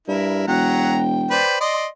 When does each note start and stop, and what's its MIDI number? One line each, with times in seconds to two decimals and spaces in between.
0.08 0.46 43
0.08 0.47 64
0.08 0.47 70
0.47 1.41 28
0.47 1.01 54
0.47 1.01 78
0.47 1.56 79
0.47 1.01 82
1.31 1.60 71
1.31 1.60 72
1.31 1.60 74
1.61 1.87 74
1.61 1.87 75
1.61 1.87 84